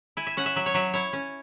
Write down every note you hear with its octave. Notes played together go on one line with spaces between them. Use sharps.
E4 G#5
E5
C#4 F#5
E5
F#3 E5
C#5
F#3 E5
E4 C#5
C#4